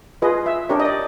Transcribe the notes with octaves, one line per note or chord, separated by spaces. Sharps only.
F4 G#4 B4 D#5
E5
D4 G4 A#4 C#5
D#5
D5